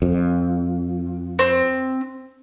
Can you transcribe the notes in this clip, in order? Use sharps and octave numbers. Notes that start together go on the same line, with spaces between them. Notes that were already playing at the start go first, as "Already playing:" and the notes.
F2
C4